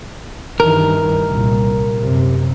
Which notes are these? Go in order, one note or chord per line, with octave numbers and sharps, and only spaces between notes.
G2 D#3 E3 A#4
C2 A#2
F#2 C3